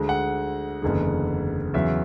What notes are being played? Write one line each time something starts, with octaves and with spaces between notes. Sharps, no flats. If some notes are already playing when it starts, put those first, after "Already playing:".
Already playing: D2 D3 G#3
F#5
F#1 E2 D3 G#3
E2 C#3 F#3 E5